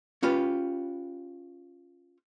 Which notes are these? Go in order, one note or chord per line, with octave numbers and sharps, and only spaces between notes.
C#4 F4 G4 B4